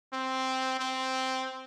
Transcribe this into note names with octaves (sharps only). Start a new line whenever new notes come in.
C4
C4